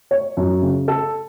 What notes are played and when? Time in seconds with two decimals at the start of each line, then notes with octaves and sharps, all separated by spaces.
0.11 C#5
0.37 F#2
0.62 C#3
0.88 A4